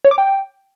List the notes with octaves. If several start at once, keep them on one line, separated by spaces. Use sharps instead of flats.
C#5
D6
G5